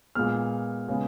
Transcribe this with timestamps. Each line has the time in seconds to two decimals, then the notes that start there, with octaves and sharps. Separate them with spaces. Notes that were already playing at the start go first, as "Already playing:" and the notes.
0.15 A#2 G#3 B3 F6
0.88 C#3 G#3 B3